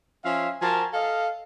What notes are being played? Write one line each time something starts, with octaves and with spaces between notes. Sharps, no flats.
F3 C#4 E5 F5 G#5
F3 F#4 A#4 G#5 A5
A4 D#5 F5